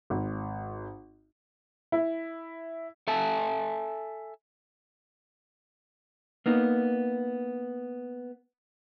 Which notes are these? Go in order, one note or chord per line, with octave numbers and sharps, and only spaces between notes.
G#1
E4
A4 E5 G#5 A5
A#3 B3 D#4